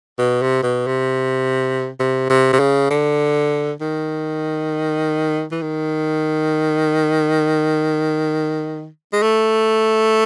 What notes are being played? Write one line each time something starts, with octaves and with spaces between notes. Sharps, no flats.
B2
C3
B2
C3
C3
C3
C3
C#3
D3
D#3
E3
D#3
G#3
A3